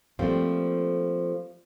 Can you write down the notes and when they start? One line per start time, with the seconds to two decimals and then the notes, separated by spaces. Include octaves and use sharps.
0.19 F3 G3 A3 A#3 C4 F4